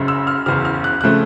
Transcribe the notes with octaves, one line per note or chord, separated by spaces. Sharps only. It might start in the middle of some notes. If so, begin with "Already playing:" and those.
Already playing: F#1 F#2 C#3
E6
F6
F#1 E2 C#3 F6
F6
F#6
C#3 F3 A3 C4 F#6